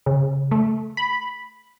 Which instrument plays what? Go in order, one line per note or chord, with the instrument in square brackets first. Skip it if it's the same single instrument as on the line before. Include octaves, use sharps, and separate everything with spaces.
[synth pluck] C#3
A3
B5